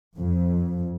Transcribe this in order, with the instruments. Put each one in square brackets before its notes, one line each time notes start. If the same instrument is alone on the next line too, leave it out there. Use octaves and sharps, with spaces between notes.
[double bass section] F2